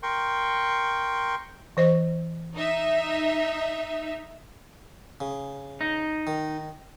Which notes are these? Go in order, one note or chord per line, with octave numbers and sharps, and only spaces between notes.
A#4 G5 C6 C#6
E3 C5 D#5
D#4 E5
C#3
D#4
D#3